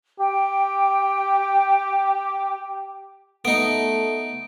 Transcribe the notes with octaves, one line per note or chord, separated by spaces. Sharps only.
G4 G5
A3 B3 D#4 D7